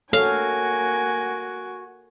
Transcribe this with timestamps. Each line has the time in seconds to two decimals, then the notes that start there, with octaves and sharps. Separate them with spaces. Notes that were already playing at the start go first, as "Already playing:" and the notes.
0.13 A#3 F#4 A4 C#5 F5 G#5